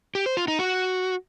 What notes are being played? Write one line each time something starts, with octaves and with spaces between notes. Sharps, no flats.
G4
C5
F4
D#4
F#4